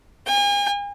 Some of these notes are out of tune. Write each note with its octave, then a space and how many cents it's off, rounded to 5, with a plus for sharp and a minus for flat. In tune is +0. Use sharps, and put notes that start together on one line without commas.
G#5 -40